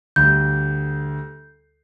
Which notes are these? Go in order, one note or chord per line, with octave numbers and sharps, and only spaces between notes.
D2 G3 G6